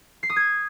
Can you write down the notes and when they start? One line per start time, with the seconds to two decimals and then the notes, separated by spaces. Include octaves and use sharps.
0.23 C7
0.30 D#6
0.36 G#6